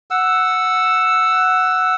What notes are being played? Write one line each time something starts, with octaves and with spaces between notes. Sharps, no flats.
F#5 E6